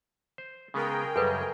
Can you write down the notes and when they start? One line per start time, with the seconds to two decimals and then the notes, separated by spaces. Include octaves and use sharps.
0.38 C5
0.74 C#3 G#3 B3 G#4 A#4 G5
1.16 F#2 C#3 G3 A4 B4